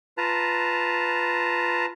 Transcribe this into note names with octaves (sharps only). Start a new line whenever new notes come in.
F4 B4 A5 A#5